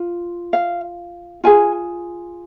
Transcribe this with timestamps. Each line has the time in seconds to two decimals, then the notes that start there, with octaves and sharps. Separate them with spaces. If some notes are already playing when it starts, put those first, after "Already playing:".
Already playing: F4
0.53 F5
1.44 F4 G#4 G#5